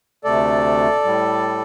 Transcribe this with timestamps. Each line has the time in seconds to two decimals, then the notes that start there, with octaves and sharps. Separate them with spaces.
0.24 D2 C3 A3 A4 D5
1.04 A2 G3